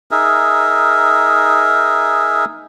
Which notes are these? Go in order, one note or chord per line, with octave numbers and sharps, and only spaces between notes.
D#4 G#4 A#4 E5